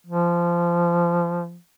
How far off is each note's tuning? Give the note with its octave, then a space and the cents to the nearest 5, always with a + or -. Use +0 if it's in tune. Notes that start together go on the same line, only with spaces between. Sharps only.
F3 -20